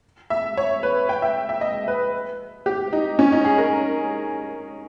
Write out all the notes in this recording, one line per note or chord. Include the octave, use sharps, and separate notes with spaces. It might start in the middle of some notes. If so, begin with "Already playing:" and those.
E5
C#5
B4
G5
E5
E5
D#5
B4
G4
D#4
C#4
D#4
G#4
A#4